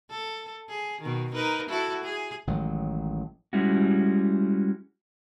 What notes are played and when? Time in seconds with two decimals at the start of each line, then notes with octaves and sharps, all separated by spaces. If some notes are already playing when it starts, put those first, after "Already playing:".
0.10 A4
0.69 G#4
1.01 B2 D#3
1.34 D#4 A#4 B4
1.69 E4 F#4 A4
2.03 G#4
2.47 A1 D#3 F#3 G#3
3.53 G3 G#3 C#4 E4 F#4